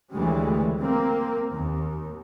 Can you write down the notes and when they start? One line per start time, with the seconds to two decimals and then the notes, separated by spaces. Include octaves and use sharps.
0.14 D2 C#3 E3 G3 G#3
0.81 A#3 C4
1.51 D#2